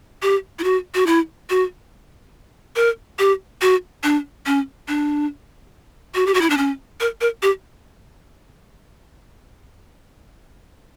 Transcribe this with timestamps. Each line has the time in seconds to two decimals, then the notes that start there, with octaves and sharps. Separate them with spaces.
0.22 G4
0.59 E4
0.64 F#4
0.94 F#4
1.06 E4
1.50 F#4
2.76 A#4
3.19 G4
3.62 F#4
4.04 D4
4.46 C#4
4.88 D4
6.15 F#4
6.27 G4
6.34 F#4
6.41 E4
6.50 D4
6.57 C#4
7.00 A#4
7.21 A#4
7.43 G4